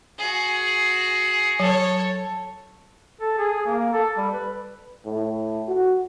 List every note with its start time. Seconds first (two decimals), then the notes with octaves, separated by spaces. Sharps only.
0.19 F#4 G#4
1.60 F#3 A4 C#5
3.21 A4
3.38 G#4
3.66 A#3
3.93 A4
4.17 G3
4.33 B4
5.05 A2
5.68 F#4